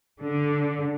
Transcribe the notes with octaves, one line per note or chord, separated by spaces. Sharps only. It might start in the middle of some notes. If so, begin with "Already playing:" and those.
D3